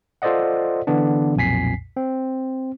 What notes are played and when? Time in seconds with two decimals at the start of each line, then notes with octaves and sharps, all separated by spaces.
0.22 F4 A4 C5 D5 D#5 F#5
0.87 D3 E3 B3 D4
1.36 B1 F2 A#2 G#5 B6 C7
1.97 C4